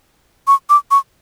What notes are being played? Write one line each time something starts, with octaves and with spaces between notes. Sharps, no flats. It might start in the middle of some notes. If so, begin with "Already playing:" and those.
C#6
D6
C#6